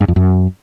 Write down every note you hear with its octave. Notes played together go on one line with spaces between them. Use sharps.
G2
F2
F#2